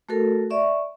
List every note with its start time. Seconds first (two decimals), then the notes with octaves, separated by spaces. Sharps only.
0.09 A3 F#4 A4 A#4
0.50 D5 E5 C#6